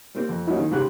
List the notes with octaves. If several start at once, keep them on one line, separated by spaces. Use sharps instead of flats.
G3 A#3 C4
F2
F#3 G3 A#3 C#4 D#4 E4
D#3
C2 G#2 C#3 G4 C6 F#6